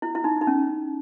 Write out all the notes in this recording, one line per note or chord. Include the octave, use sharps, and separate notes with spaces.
E4
E4
D#4
D#4
C#4